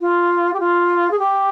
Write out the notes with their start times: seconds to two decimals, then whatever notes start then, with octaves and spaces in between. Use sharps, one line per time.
0.01 F4
0.53 G4
0.60 F4
1.11 G#4
1.19 G4